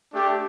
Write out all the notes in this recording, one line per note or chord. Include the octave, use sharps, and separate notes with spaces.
A3 D4 G4